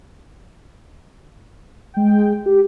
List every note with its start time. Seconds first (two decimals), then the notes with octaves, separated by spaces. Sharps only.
1.94 G#3 G5
2.46 G4